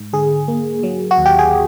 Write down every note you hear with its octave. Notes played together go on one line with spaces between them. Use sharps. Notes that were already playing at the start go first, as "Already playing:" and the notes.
Already playing: G#2
D3 G#4
A#3
F#3
F#4
D#2
G4
G#4